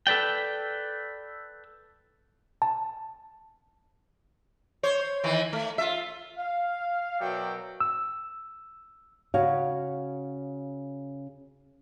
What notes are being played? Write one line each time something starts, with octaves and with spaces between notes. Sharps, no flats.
A4 B4 D5 G5
A5
C5 C#5
D#3 E3
A3
F4 E5
F5
B2 F#3 A#4 D5 E5 G5
E6
C#3 F#4 C#5 F5